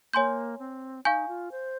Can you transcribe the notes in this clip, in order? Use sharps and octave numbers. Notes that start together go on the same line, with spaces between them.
A#3 C#5 G#5 C6 G6
C4
D#4 F5 G#5 C#6 G6
F4
C5